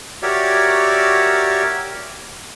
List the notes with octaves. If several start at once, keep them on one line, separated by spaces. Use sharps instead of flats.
F#4 G4 A#4 C#5 D5 E5